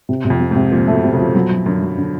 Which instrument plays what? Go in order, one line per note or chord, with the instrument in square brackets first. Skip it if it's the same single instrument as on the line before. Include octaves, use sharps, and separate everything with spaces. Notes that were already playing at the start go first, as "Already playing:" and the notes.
[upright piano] C3
C3
[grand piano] F2
[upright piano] C3
[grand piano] G#2 [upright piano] C3
[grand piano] A#2 [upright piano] F3
[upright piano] A3
[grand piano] B2
[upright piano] C3
[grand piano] C#3 [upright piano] F3
[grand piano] B2 [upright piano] F#3
[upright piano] F#3
[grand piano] F#2 [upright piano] D3
[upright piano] F#3
D3